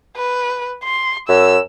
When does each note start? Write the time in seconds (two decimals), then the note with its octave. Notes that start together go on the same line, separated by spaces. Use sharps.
0.17 B4
0.84 C6
1.29 F#2 E6